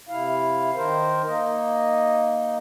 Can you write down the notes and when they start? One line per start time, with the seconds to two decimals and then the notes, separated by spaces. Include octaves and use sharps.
0.09 C3 E4 F5
0.75 D#3 A#4 C5
1.26 A#3 D#4 D#5